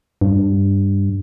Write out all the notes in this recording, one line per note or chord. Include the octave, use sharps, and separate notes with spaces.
G2